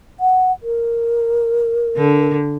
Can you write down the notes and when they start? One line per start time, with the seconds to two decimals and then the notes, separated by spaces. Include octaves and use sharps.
0.20 F#5
0.63 A#4
1.97 D3